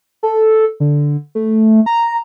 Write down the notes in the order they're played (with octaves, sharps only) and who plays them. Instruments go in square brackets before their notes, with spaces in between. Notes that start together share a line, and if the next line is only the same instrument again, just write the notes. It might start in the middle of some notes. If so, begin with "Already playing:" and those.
[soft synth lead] A4
D3
A3
A#5